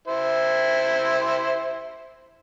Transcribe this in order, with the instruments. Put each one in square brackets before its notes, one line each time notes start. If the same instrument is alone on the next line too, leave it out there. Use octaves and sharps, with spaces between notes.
[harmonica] E4 C5